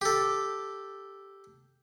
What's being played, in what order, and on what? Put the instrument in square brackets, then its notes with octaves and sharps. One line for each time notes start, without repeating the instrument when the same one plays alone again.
[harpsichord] G4 A4